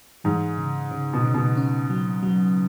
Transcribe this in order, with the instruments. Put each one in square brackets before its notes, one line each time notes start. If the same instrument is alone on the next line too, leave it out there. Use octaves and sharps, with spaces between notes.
[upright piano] G#2 [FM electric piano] E3
[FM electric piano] C#3
C#3
[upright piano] B2
[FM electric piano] C#3
[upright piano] B2
[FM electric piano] C#4
F#3
F#3